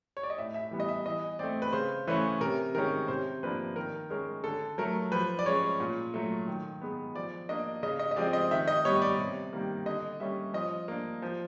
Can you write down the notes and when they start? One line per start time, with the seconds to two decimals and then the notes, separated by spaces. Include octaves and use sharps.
0.17 C#5
0.23 D5
0.30 D#5
0.38 A2 E5
0.54 E5
0.71 E3 G3 B3
0.80 D#5
0.89 E5
1.05 E3 D#5
1.39 A3 C4 D5
1.62 B4
1.73 C#3 C5
2.07 E3 A3 C#4 B4
2.41 C3 A#4
2.75 D#3 G#3 C#4 A#4
3.08 C3 C5
3.43 F3 A#3 D4 B4
3.76 D#3 A#4
4.10 G#3 C#4 A#4
4.44 D3 A4
4.78 F#3 A3 A#4
5.11 F3 B4
5.39 D5
5.46 G#3 C#4 C#5
5.80 A#2
6.14 F#3 A3
6.47 D#3
6.81 G#3 B3
7.15 F3 D5
7.49 A#3 D4 D#5
7.83 C#3 D#5
7.99 D#5
8.11 D#5
8.16 F3 G#3 C4 D5
8.33 D#5
8.51 D#3 E5
8.68 D#5
8.85 G3 B3 C#5
9.02 D5
9.19 C3
9.53 D#3 G3 A#3
9.86 D3 D#5
10.20 G3 A#3 C#4 E5
10.54 F3 D#5
10.88 A#3 D4
11.22 F3